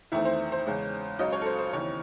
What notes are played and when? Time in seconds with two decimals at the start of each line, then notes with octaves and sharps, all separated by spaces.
0.12 E2 D#3 A3 C4 E4
0.25 C5
0.52 C5
0.66 E2 C#3 G#3 C#4
1.19 C#2 C#3 F#3 C#4 D#5
1.32 C#5
1.42 A4
1.46 C5
1.59 C5
1.73 D#2 C#3 E3 C4 C#5